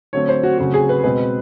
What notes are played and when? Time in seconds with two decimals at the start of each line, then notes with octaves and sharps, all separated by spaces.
0.13 D3 F#3 A3 C4 C#5
0.29 C5
0.43 F#4
0.58 C#3 F#3 A3 C4 F#4
0.74 G#4
0.89 B4
1.04 B2 G#3 C4 B4